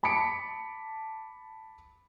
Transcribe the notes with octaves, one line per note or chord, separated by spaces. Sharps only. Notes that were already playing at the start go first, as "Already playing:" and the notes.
A5 B5 D6 B6 C#7 D7